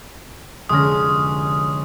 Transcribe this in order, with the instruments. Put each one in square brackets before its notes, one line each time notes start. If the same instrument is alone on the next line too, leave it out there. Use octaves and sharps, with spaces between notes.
[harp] F1 D3 A#6 [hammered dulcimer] G#3 C#4 [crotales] D#6